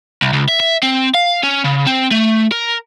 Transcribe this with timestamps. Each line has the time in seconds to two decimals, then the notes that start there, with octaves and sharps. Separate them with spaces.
0.22 C2
0.33 C#2
0.49 E5
0.60 E5
0.83 C4
1.14 F5
1.44 C#4
1.65 C#3
1.87 C4
2.11 A3
2.52 A#4